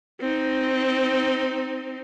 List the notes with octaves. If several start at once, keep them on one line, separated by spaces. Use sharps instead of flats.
C4 D#4